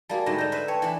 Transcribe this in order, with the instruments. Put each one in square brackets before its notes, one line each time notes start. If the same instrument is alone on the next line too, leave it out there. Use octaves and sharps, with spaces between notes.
[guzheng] G3 A#3 G#4 [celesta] F#4 F5 A5
[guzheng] G#2 D3 A3 [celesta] B5 A#6
[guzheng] D3 D#4 [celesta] G6 A#6 E7
[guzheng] B4 C5 E5
[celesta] B4 G5 A5 [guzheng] C#5
[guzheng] E3 D4